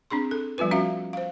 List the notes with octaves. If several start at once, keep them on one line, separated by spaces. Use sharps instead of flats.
C4 D4 G#4 C6
A4
F3 G3 B3 F4 B4
C#4 F#4 E5 F5
C5 F5